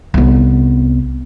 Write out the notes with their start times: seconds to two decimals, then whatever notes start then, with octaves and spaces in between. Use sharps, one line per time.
0.14 C2 B3